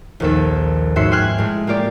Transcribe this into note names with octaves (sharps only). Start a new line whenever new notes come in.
A#1 D#2 A4
G#2 C#4 F#4 E5 C6 C#7
G5 G#5 C6 F6 F#6 G#6
A2 G#3
A#3 F4 G4 D5